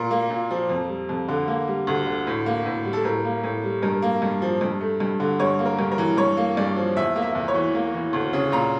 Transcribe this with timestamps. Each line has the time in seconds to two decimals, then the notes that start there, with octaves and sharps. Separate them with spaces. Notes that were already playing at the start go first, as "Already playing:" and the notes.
Already playing: A#2 A#4
0.11 A#3
0.30 A#2
0.51 F3
0.69 F2
0.89 G3
1.09 F2
1.28 D3
1.48 A#3
1.67 G3
1.87 D2
2.07 D3
2.27 A2
2.46 A#3
2.66 A2
2.85 G3
2.93 A4
3.04 A2 A#4
3.25 A#3
3.43 A2
3.64 G3
3.82 G2 A#4
4.02 A#3
4.22 G2
4.42 F3
4.61 G2
4.81 A3
5.00 G2
5.20 D3
5.39 G2 C#5
5.59 A#3
5.66 A#4
5.79 G2
5.92 A#4
5.98 E3
6.17 G2 C#5
6.37 A#3
6.57 G2 D5
6.76 F3
6.96 E2 E5
7.16 A#3
7.22 E5
7.35 E2
7.48 C#5
7.55 E3
7.75 A#3
7.94 E3
8.13 D2
8.33 C#3
8.52 A#2 A#5